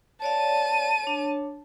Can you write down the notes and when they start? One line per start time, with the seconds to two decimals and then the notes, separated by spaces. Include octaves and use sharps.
0.22 C#5 D5 F5 A5 D#7
1.04 D4 C#5